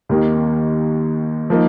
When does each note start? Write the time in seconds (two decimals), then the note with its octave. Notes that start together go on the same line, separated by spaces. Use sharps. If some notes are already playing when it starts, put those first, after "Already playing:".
0.09 D#2 D#3 A#3 D#4
1.50 F3 A#3 D#4